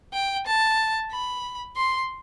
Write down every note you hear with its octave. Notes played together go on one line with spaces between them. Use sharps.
G5
A5
B5
C6